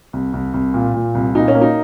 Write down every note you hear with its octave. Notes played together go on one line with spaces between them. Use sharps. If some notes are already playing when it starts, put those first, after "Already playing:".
C2
C2
C2
A#2
A#2
C2
A#2 D#4
C#4
A#3
D#4